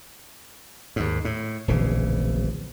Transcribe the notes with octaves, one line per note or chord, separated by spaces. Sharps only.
D#2 G#2
A2
D1 A#1 C#3 E3